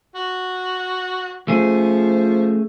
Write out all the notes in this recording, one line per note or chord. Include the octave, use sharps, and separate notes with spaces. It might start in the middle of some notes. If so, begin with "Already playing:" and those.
F#4
F3 A3 C#4 G#4